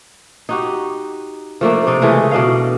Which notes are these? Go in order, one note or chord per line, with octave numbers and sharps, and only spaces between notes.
D#4 F#4 G4
F3 A3 A#3 D4
C3 D#4 D5
C#3 E3 G#3 A3
B2 D4 D#5 F5